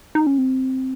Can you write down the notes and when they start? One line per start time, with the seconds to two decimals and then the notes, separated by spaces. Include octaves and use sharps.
0.15 D#4
0.27 C#4
0.38 C4